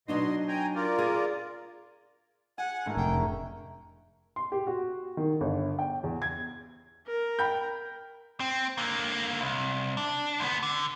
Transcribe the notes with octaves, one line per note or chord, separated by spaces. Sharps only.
B2 F#3 D4 D#4 D#5 C6
G5 G#5 A#5
F4 A#4 D5
G#4
F#5 G#5
A2 D3 G#3 A3 G#4 A#4
F1 D4 G5
C#4
C6
G4
F#4
D#3
G1
G5
E2
G#6
A#4
G5 B5 G6
C4
D3 A#3
C2
D4
D2 B3
D3